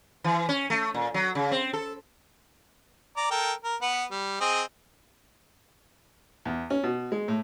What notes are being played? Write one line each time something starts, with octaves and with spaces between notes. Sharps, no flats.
E3
C#4
A3
A#2
F#3
C#3
C4
A4
D5 A#5
A4 A#4 G5
A#4
B3 B4 F#5
G3
C4 G#4 D#5
E2
C#4
B2
G#3
A2